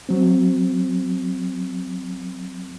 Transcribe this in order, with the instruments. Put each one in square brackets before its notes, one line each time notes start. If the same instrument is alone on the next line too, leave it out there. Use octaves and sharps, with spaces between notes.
[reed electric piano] F#3 C4